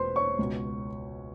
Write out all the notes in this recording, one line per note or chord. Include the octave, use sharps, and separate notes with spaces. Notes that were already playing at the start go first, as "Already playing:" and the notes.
Already playing: E1 B4 C5 C6
C#5 C#6
C#2 B2